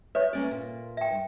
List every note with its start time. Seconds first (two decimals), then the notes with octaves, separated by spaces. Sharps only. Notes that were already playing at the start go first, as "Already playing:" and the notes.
0.15 B4 C#5 E5
0.33 A#3 C#4 D5
0.51 A#2
0.97 E5 G5
1.11 G2